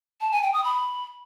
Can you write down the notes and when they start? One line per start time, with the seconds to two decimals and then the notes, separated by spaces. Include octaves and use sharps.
0.21 A5
0.32 G#5
0.42 G5
0.53 D#6
0.64 B5